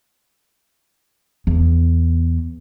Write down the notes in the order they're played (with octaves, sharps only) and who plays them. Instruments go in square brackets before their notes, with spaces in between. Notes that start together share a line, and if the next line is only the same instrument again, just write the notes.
[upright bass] E2